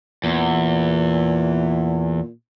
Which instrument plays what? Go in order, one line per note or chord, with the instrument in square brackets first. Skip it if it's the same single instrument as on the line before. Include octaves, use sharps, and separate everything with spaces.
[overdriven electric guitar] E2 [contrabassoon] A#2